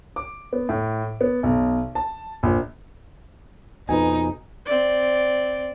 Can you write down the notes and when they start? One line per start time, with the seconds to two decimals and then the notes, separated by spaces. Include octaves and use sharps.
0.16 D6
0.53 B3
0.69 A2
1.21 B3
1.43 B1
1.95 A5
2.43 A#1
3.89 F2 B2 D#4 B4 G#5
4.66 C4 D5